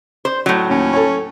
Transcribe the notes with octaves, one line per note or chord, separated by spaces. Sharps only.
C5
A2 F#3
D#2 C#4
A4 C#5